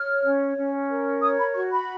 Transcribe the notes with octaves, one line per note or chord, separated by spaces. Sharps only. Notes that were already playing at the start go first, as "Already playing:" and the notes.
Already playing: C#5 F6
C#4
C#4
A#4
C#5 D#6
B5
F#4 C#6
B5